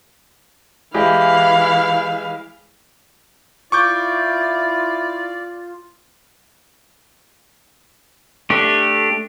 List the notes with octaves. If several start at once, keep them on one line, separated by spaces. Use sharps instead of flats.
E3 G#3 E4 G4 F5
E4 F4 D5 C#6 D6 G6
A3 D4 G4